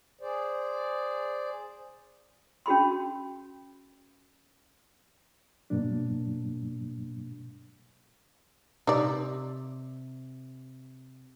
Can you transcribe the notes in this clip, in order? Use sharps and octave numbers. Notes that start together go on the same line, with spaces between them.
G#4 C5 D5
C#4 F#4 G#4 B5 C6
G2 B2 F#3 A#3 D4
C3 D#4 D5